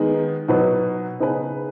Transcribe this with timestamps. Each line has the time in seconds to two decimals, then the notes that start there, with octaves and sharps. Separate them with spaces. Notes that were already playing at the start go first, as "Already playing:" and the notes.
Already playing: D#3 G#3 B3 D#4
0.48 B2 F#3 D#4 B4
1.19 C#3 B3 D#4 G#4 B4